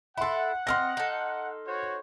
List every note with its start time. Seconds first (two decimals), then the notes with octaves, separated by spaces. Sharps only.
0.18 E4 A4 F#5 B5 C6
0.67 C4 D4 D#5 C6 F6 A#6
0.97 D#4 A4
1.66 F#4 C5 C#5